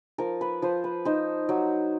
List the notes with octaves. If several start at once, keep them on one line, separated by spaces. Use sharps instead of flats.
F3 A#4
B4
F3 C5
B4
D#4 C5
F#3